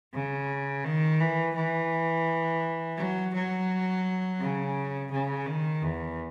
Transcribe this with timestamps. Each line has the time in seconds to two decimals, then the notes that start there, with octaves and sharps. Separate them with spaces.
0.13 C#3
0.84 D#3
1.20 E3
1.55 E3
2.97 F#3
3.34 F#3
4.40 C#3
5.11 C#3
5.46 D#3
5.82 E2